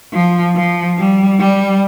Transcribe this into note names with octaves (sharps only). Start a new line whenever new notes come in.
F3
F3
G3
G3